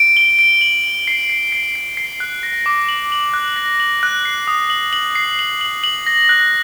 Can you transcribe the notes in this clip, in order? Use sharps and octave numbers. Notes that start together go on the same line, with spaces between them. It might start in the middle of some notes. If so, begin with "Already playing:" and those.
Already playing: D7
G7
D7
F#7
F#7
C7
C7
C7
C7
C7
F#6
A#6
D6
F#7
F#7
F#6
A#6
F#7
F#6
C7
D#6
F#7
F#7
C7
F#7
F#7
F#7
A#6
F#6